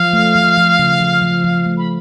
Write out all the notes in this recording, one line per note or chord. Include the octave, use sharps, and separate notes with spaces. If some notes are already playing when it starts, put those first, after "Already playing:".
Already playing: F3 F5
A3
F3
F3
C#3
F3
F3
F3
A3
B5